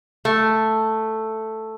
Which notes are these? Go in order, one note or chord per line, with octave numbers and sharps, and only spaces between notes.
A3